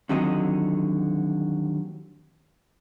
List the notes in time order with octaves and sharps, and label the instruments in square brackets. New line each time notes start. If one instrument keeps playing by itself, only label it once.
[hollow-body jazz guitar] D#2 D3 F3 F#3 C4 D#5